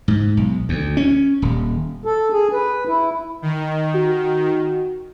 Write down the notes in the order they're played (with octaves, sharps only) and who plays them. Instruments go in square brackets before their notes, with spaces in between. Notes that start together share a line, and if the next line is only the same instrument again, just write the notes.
[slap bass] G#2
B1
D2
C#4
D#1
[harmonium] A4
G#4
B4
E4
[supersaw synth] D#3
[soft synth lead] F#4